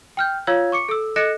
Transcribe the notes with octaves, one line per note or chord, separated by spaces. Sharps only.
G5 F6 G6
F4 C#5 F5 E6 G#6
C#6 D6 C#7
A4 E6
A4 D#5 F#6 A#6 C#7 E7